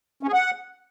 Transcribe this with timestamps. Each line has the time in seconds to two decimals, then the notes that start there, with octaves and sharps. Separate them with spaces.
0.23 C#4
0.28 G#4
0.33 F#5